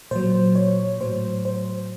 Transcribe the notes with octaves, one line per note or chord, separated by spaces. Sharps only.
A#2 F#3 C5
C#5
A2 F#3 C5
C5